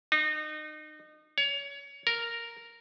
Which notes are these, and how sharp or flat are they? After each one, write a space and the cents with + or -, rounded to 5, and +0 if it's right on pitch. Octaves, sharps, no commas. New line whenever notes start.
D#4 -30
C#5 +25
A#4 -5